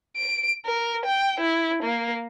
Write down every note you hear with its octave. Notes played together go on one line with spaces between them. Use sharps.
D7
A#4
G5
E4
A#3